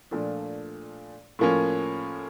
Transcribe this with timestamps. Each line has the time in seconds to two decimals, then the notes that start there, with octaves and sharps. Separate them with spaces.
0.11 A#2 F3 A3 D4
1.39 A2 F3 A#3 C#4